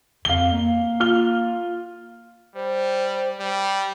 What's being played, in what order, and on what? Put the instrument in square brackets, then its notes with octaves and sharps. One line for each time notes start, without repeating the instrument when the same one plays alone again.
[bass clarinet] F2 [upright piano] F5 G7
[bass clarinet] A#3
[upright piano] F4 F6 G7
[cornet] G3 [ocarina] C5
[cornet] G3